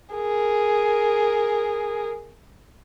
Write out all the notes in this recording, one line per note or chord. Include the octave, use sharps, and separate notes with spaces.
G#4 A#4